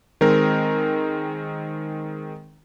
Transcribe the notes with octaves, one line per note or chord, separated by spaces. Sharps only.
D#3 G#3 C4 A#4